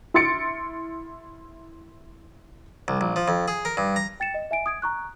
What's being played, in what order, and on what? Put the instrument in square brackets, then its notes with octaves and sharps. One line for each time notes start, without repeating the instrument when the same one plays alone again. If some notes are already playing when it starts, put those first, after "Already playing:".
[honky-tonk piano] E4 C6 A6 C#7 D7
[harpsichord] C2
A#1
F3
F2
G#4
A#4
G2
A#5
[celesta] G5 A6 C#7 E7
D#5
E5 G#5 D7
D#6 G#6 D7
A#5 C#6 F#6